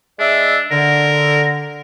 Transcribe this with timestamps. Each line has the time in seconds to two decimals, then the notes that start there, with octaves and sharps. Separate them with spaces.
0.19 G#3 D4 D5 E5
0.71 D3 A#4